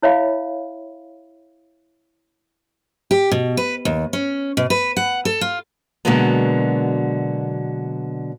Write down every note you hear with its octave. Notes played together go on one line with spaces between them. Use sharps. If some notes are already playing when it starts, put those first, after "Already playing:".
E4 C#5 E5 F5 B5
G4
B2
B4
D#2
C#4
B2
B4
F#5
A4
F4
B2 D3 F#3 G#3 A#3 B3